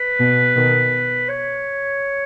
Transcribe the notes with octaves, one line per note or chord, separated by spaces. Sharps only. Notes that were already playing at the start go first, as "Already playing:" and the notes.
Already playing: B4
B2
B2 D#3
C#5